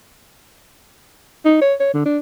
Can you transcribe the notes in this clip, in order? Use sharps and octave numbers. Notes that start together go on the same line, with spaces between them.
D#4
C#5
C#5
D3
D4